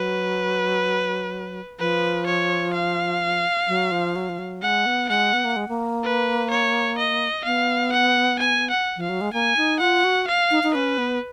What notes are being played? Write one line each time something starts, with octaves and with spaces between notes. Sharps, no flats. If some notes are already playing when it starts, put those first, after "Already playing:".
Already playing: F#3 B4
F3 B4
C#5
F5
F#3
F3
F#3
F3
F#3
G#3 F#5
B3
G#3 F#5
B3
A#3
G#3
A#3
B4
C#5
D#5
B3 F5
F#5
G#5
F#5
F3
F5
F#3
G#3
A#3 G#5
D#4
F4 F#5
F#4
F5
D#4
D#4
C#4 B4
B3